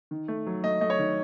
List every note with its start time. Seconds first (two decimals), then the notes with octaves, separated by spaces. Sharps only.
0.11 D#3
0.28 A3
0.47 F#3
0.64 A3 D#5
0.81 A3 D#5
0.90 C#5
0.99 D#3